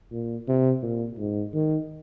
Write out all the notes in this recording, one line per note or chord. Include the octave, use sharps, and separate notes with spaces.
A#2
C3
A#2
G#2
D#3